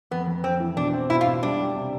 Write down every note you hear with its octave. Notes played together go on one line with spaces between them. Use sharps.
F2 B3
F2
F2 C4
E3
B2 D4
C4
B2 E4
F4
B2
G3 D4
G3
C3